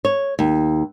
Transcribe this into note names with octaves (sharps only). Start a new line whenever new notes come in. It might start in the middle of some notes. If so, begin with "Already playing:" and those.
C#5
D#2